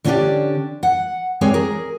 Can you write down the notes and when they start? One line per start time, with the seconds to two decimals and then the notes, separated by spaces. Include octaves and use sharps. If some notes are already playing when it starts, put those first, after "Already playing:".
0.04 D3 C#4 D4 F#4 G4 D5
0.83 F#5
1.41 G#3 C4 G#4 C#5 D5
1.54 G#4 A#4